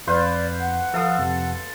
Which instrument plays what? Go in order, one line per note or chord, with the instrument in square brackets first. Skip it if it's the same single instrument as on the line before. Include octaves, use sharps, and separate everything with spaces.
[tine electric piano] F2 [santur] B4 C5 F5 [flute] D5
[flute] F#5
[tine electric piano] F3 F5 D#6 [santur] A4
[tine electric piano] F2 C3